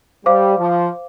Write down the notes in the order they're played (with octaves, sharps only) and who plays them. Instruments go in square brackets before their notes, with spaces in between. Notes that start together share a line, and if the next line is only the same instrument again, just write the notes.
[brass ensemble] G3 [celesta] C5 F5 D6
[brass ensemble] F3